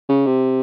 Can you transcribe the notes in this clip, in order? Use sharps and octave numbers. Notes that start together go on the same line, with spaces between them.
C#3
C3